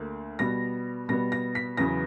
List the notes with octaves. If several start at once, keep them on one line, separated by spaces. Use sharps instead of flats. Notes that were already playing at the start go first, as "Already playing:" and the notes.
Already playing: D2 D3 A#3
B2 G3 B3 A#6
B2 G3 B3 A#6
A#6
B6
E2 C#3 F#3 B3 A#6